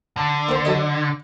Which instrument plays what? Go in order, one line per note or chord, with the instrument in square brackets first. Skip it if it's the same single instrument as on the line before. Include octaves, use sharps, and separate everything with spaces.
[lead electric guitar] D3
[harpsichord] A#3 C4 C5
F#3 A4 D#5